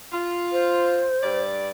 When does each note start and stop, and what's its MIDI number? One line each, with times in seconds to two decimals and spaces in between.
0.13 1.06 65
0.52 1.43 72
1.22 1.70 43
1.22 1.70 74